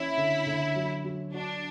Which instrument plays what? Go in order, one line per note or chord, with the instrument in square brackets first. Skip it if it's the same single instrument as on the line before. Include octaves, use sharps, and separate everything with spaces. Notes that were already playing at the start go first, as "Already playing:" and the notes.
Already playing: [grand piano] E3 C#4 [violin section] E4
[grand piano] D3
D3
F#3
F#3
[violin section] D4 [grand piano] F#4